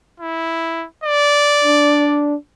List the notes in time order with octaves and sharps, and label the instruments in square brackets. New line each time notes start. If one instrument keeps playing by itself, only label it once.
[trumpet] E4
D5
[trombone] D4